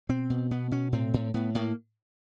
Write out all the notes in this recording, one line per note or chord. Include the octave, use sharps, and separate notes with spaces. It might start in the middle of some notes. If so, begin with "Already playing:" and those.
B2 C4
B2
B2 B3
B2 C#4
A2 C4
A2
A2 B3
A2 A#3